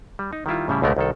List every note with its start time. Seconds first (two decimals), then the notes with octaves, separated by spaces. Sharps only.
0.19 G3
0.33 D#4
0.46 D#3 G3 E4 F4
0.68 A2 C#3 G3 E4
0.82 C#2 B2 D3 A3 B3 A#4
0.97 C2 D#3 A4